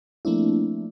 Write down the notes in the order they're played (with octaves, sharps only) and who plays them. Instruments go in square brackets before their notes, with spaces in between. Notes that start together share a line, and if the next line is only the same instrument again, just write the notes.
[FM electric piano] F3 A3 A#3 C4 D4 E4